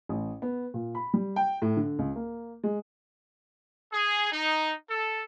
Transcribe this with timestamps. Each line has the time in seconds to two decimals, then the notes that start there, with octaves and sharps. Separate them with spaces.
0.09 A1
0.42 B3
0.74 A#2
0.95 B5
1.14 G3
1.36 G5
1.62 A2
1.77 D3
1.99 C#2
2.16 A#3
2.64 G#3
3.92 G#4
4.31 D#4
4.89 A4